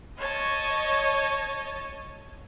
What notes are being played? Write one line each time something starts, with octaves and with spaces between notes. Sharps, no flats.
C#5 D#5 A5